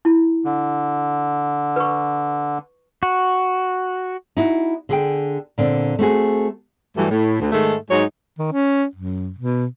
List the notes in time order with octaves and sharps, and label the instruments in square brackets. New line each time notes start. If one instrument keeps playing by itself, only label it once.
[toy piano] E4
[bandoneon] D3
[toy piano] B4 C#6
[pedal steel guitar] F#4
[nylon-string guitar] D#4 E4 F#4
D3 G#4 G5
A#2 D3 C4
A3 C4 F#4 G#4
[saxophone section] G2 E3 F#3 G3 A3
A2
D2
G#2 D#3 G#3 A3
G#2 F#3 D#4 C#5
[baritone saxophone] D#3
C#4
F#2
B2